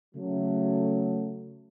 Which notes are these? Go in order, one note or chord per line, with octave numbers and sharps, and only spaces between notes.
C#3 F#3 A3